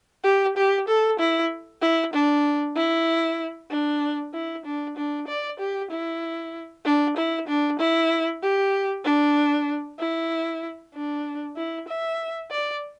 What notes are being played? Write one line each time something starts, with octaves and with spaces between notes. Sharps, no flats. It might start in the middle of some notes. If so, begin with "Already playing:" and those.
G4
G4
A4
E4
E4
D4
E4
D4
E4
D4
D4
D5
G4
E4
D4
E4
D4
E4
G4
D4
E4
D4
E4
E5
D5